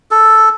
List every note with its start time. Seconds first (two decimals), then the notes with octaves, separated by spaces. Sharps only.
0.11 A4